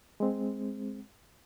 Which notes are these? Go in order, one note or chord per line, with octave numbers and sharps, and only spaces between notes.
G#3 C4